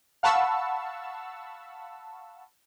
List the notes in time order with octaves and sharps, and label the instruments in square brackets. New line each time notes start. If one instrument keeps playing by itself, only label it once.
[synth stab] F5 F#5 A5 B5 C#6 E6